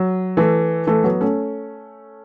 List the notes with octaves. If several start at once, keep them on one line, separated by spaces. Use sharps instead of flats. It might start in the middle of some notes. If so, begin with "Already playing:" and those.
Already playing: F#3
E3 A3
E3 A3
F#3 B3
A3 C#4